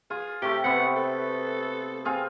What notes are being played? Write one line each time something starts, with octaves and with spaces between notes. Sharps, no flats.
F4 G#4
C3 A3 G4
C3 B3 C4 F#5
A4
C4 F4 G#4